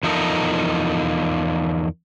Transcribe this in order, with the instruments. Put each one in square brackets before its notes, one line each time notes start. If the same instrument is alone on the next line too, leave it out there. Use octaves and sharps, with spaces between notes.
[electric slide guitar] E2 F3 D#4 A4 A#4